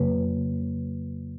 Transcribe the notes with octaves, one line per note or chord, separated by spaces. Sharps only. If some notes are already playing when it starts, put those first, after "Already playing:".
Already playing: F2 C#3 F#3 A#3 B4